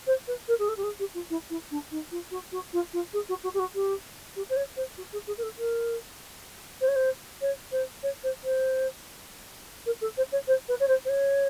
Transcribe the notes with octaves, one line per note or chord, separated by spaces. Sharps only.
C5
B4
A#4
G#4
A4
G4
G#4
G4
F4
E4
E4
D4
D#4
F4
F#4
F#4
F4
F4
G#4
F#4
F#4
G4
F#4
G4
G4
C5
C#5
C5
F#4
G#4
G#4
A#4
A4
A#4
C5
C#5
C5
C#5
C5
C#5
C5
C5
A#4
A4
C5
C#5
C5
B4
C#5
C5
C5
C#5